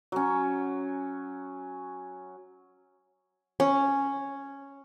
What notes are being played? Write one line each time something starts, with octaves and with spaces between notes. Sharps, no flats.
F#3 C#4
C#4